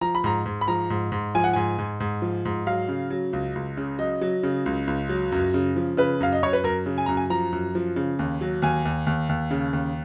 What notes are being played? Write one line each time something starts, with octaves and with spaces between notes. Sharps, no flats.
F3 A#5
B5
G#2 A#5
G#2
B5
F3 A#5
G#2
G#2
F3 G#5
F#5
G#2 G#5
G#2
G#2
F3
G#2
F#3 F5
C#3
F#3
C#2
C#2
C#3
F#3 D#5
F#3
C#3
C#2
C#2
F#3
F#2
C#3
F3
C#3 B4
F#2 F5
D#5
F#2 C#5
B4
F#2 A#4
C#3
G#5
F#2 A#5
G#5
F3 A#5
F#2
F3
C#3
D#2
F#3
D#2 G#5
D#2
D#2
D#2
C#3
D#2